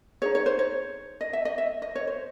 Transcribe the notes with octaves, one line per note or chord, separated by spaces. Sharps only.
D#4 G#4 C#5
C#5
C5
C#5
D#5
E5
D#5
E5
D#5
C#5
C5